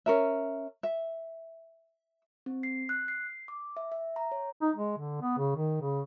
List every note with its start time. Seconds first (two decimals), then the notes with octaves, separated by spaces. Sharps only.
0.06 C#4 A#4 E5
0.83 E5
2.46 C4
2.63 C7
2.89 F#6
3.08 C7
3.48 D6
3.77 E5
3.92 E5
4.16 A#5
4.32 C#5
4.62 D#4
4.76 G#3
4.98 D3
5.22 B3
5.38 C#3
5.56 D#3
5.82 C#3